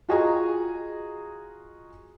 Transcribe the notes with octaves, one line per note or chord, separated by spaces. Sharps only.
F4 F#4 G#4 D#5 G#5 A#5